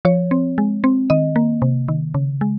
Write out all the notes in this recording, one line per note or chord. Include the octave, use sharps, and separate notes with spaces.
F3 C#5
C4
G#3
C4
D#3 D#5
A#3
C3
D#3
C#3
G#3